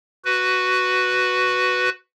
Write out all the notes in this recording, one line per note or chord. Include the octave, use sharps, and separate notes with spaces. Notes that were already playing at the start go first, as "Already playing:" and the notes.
F#4 B4